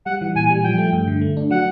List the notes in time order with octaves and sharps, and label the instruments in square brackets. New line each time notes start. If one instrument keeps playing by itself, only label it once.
[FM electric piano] G3 [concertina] F#5
[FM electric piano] E3
[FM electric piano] A#2 [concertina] G#5
[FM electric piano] G3
[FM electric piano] F3 [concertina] G5
[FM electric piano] A3
G2
D3
A3
D4
[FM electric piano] F#3 [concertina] F#5